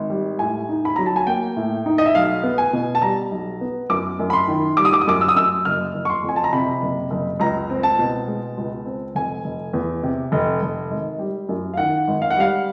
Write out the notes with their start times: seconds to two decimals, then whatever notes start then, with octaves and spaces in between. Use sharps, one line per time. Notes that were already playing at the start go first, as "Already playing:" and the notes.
Already playing: G#1
0.10 G3
0.39 A2 G#5
0.69 D#4
0.85 B5
0.96 F#3 A#5
1.06 A5
1.16 G#5
1.27 A#3 G5
1.57 A2
1.86 D#4
1.98 D#5
2.06 E5
2.15 B1 F5
2.44 B3
2.58 G#5
2.73 B2
2.95 A5
3.02 G3 A#5
3.32 B1
3.61 B3
3.90 F#2 D6
4.19 F#2
4.30 B5
4.33 C6
4.48 D#3
4.77 G3 D6
4.85 D#6
4.93 D6
5.01 D#6
5.07 F#2 D6
5.21 E6
5.28 D#6
5.36 F#2 E6
5.65 F#1 F6
5.94 F#1
6.05 C#6
6.09 C6
6.24 F2 G#5
6.36 A5
6.44 A#5
6.53 C3 B5
6.82 F#1
7.10 F#1
7.40 C#2 A#5
7.70 C4
7.83 A5
7.99 B2
8.28 G#3
8.57 C#2
8.86 C4
9.15 F1 G#5
9.44 F1
9.73 E2
10.03 C3
10.32 F1
10.62 F1
10.91 G#1
11.19 G3
11.49 F#2
11.74 F5
11.77 D#3 F#5
12.08 G#1
12.22 F5
12.30 F#5
12.36 G3 F5